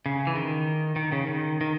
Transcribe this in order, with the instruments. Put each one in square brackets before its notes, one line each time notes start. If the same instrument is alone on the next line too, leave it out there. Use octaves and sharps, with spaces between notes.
[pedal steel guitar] C#3
E3
D#3
D#3
C#3
D#3
D#3